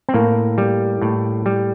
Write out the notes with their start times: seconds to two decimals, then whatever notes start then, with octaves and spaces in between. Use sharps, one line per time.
0.09 C4
0.14 A2 A#3
0.58 G3
1.02 A2
1.46 G3